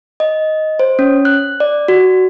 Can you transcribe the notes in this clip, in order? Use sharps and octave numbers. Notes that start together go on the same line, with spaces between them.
D#5
C5
C#4
F#6
D5
F#4